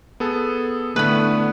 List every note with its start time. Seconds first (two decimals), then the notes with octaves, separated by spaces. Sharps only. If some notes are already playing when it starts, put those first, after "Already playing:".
0.20 B3 G#4 A4
0.96 A2 D3 A3 B3 B4 B5